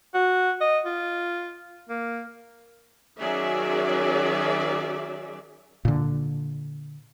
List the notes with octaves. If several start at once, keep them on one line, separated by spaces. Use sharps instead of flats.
F#4
D#5
F4
A#3
D#3 F#3 C#4 G#4 D5 E5
A#2 D3